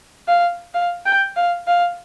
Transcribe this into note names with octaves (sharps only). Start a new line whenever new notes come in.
F5
F5
G5
F5
F5